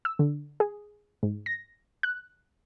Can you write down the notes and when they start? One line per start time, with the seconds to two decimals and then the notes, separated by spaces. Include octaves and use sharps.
0.05 E6
0.19 D3
0.60 G#4
1.23 G#2
1.46 A#6
2.03 F#6